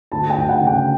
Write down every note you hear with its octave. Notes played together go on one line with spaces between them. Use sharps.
D2 A5
G5
D2
F#5
C#3
G5